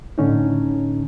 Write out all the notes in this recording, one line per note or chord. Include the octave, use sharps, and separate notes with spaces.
A2 D3 C#4 D#4